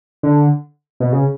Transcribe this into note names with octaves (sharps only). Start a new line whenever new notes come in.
D3
B2
C#3